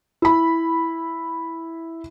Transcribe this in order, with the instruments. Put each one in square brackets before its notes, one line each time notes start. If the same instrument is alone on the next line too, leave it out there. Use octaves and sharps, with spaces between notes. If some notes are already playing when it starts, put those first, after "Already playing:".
[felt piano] E4 B5